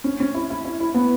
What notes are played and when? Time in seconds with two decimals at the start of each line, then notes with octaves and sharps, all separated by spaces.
0.04 C#4
0.20 C#4
0.34 E4
0.50 E4
0.65 E4
0.80 E4
0.94 B3